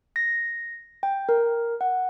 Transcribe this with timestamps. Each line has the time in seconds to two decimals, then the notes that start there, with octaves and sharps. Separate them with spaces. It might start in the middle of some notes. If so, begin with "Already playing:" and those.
0.16 A#6
1.03 G5
1.29 A#4
1.81 F#5